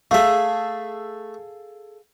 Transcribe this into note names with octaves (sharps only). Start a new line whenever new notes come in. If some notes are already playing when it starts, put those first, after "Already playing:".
A3 G#4 A4 E5 F5